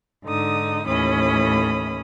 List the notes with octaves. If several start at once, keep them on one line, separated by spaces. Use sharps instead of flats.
G#2 D3 D#4 D#6
D#2 A2 E3 C#4 B5 D#6